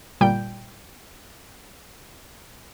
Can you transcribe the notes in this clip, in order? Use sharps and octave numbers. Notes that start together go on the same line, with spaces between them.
G1 A#2 G3 G5 G6